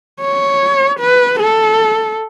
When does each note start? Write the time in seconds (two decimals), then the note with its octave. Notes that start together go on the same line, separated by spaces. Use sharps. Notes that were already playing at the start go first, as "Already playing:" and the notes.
0.21 C#5
0.99 B4
1.40 A4